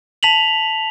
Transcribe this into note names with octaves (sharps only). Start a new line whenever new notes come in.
A5 B6 F7 F#7